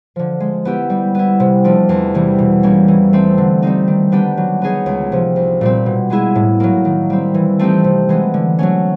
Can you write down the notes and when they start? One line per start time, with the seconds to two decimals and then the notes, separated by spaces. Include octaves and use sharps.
0.16 D3 F3
0.40 G#3
0.65 B3 E4 G4
0.90 G3
1.15 B3 E4
1.40 C3
1.64 F3 A3 D4
1.89 E2
2.14 C3 E3 G3
2.39 B2
2.63 G3 A#3 C#4
2.88 E3
3.13 A3 C4
3.38 D3
3.62 G3 C4 D#4
3.87 D#3
4.12 G3 B3 D4 G4
4.37 F#3
4.62 B3 D#4 G#4 C#5
4.86 C#2
5.12 C3 F3
5.36 C2
5.61 A#2 G3 C4
5.86 B2
6.10 G#3 B3 E4 G#4
6.35 A2
6.60 F#3 A#3
6.85 D#3
7.10 G3 C4
7.34 E3
7.59 A3 C4 D#4 G4
7.84 C3
8.09 E3 G#3 B3
8.34 D3
8.59 F#3 A3 C#4